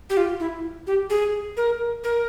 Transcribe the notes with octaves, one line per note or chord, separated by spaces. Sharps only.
G4
F4
E4
G4
G#4
A#4
A#4